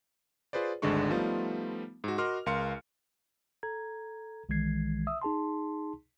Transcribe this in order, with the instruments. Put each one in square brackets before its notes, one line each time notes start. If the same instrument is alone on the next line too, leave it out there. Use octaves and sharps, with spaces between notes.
[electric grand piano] F4 G#4 B4 C5 D5
G#1 D2 D3 G#3 D4 C#6
F3 G3 A3 B3 D#4 F4
G#2 F#4
F#4 A#4 D#5 C6 D6 F6
C#2 A#4 F5 C6 C#7
[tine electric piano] A4 A#5 G#6
B1 D#3 E3 G#3 G#6 C7
E5 D#6 E6
D#4 G#4 A5 C6